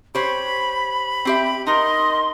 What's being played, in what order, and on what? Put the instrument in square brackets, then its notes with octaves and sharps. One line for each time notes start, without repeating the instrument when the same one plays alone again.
[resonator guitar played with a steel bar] G4 C5 C#5 [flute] B5
[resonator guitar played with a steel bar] C4 G4 E5
[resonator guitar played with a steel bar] D#4 A#4 [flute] D#5 [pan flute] C6